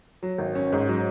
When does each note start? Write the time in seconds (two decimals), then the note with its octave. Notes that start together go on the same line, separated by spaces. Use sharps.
0.23 F#3
0.38 G#1
0.55 C#4
0.72 G#2
0.88 F#3